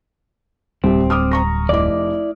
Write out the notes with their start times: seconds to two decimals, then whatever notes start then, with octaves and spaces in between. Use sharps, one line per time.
0.84 D1 C2 G3 C4 G4
1.10 D6 D#6 F6
1.31 A#5 C#6 A#6
1.69 F1 E4 D5 D#5 D6